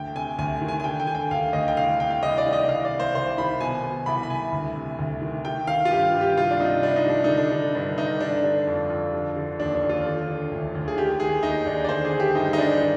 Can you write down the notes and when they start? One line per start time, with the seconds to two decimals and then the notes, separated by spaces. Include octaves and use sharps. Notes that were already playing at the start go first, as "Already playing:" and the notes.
Already playing: D2 G5
0.15 C3 G#5
0.38 D2 G#5
0.61 D#3
0.68 G#5
0.80 G#5
0.84 D3 G5
1.00 G5
1.07 D3 G#5
1.15 G5
1.31 D2 F5
1.53 D2 D#5
1.68 G5
1.77 C2 F5
2.00 C3 G5
2.10 F5
2.22 C2 D#5
2.38 D5
2.46 D#3
2.53 D#5
2.69 C2 F5
2.85 D5
2.92 C3
3.00 C5
3.14 C2 C5
3.38 D#3 B5
3.60 B2 G#5
3.83 B2 G#5
4.06 C2 B5
4.23 B5
4.30 C2 G#5
4.53 D2
4.75 C3
4.99 D2
5.22 D#3
5.45 D#3 G5
5.67 D#3 F5
5.85 F4
5.91 G2 G4
6.14 G2
6.21 G4
6.36 C2 F4
6.51 D4
6.60 C3 D#4
6.83 C2 D4
6.96 D#4
7.06 D#3 D4
7.24 D3 D#4
7.37 D4
7.52 D3
7.75 G2 D4
7.97 G2 D#4
8.21 D3 D4
8.43 D3 D4
8.67 F2
8.90 F2
9.13 D3
9.36 D3
9.59 D#2 D4
9.75 D4
9.83 D#2
9.89 F4
10.06 D3
10.28 D3
10.52 D2
10.75 D2
10.88 G#4
10.97 D#3 G4
11.20 D#3 G#4
11.43 D#2 D#4
11.66 D#2 D4
11.84 D5
11.89 D3 C5
12.05 G#4
12.12 D3
12.20 G4
12.35 G2 D#4
12.53 D#4
12.58 G2 D4
12.81 D#3